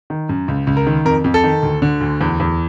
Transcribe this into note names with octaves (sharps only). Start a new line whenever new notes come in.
D#3
F#2
C#2
C#2
A#4
D#3
F2 A#4
F2
A4
D#3
D2
D3
D2
E2
E2